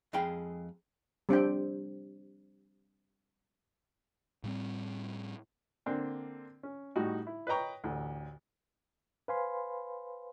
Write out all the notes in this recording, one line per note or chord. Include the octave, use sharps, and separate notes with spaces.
F2 G#3 G#4 F5 G5 B5
G3 C4 D4 G5
A2 G3 C4
D3 A#3 C4 D4
C#4
A2 G3 D#4 F#4
E4
B4 C#5 D#5 G5 A#5 C#6
A1 D2
B4 C5 F5 G#5 B5 C6